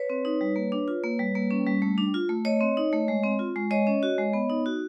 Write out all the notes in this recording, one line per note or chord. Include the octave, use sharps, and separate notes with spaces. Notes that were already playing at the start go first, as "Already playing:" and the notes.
Already playing: B4 C#5
C4
D#4
G3
A#3
D4
F4
A#3
G3
A#3
C#4
G3
A3
D4
F4
A3
A3 C#5 D#5
C4
D#4
A3
G#3
C4
F4
G#3
G#3 C#5 D#5
C#4
F#4
G#3
B3
D#4
F#4